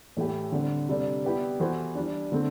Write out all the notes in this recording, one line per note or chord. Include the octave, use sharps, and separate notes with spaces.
A2 E3 A3 E4 G4
D3 G3 C4
C3 G3 D4 A4
B3 E4 G4 B4 D5
E3 B3 F#4 A4 C5
E3 G3 D4
D3 A3 C4